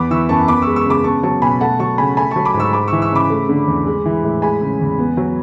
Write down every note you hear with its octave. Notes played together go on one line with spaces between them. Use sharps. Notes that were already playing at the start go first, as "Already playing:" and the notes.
Already playing: E2 B3 B5 D6
E3 C#6 E6
F#2 A5 C#6
B3 B5 D6
G#3 C#6 E6
C#6 E6
C#3 B5 D6
B3 A5 C#6
F#3 A5 C#6
B2 G#5 B5
A3 F#5 A5
F#3 A5 C#6
C#3 G#5 B5
A3 G#5 B5
F#3 A5 C#6
B5 D6
G#2
C#6 E6
G#3 B5 D6
E3 C#6 E6
C#6 E6
C#3 B5 D6
A3
D3
E2
G#3
E3
A2
G#3 G#5 B5
C#3
E2
B3
F#3